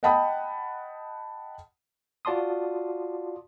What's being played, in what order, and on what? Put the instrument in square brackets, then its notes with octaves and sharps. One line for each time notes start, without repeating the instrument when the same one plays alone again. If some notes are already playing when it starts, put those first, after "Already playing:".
[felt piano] D#5 F#5 G5 A5 B5 D#6
[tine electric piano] F4 F#4 D5 A5 C6 D#6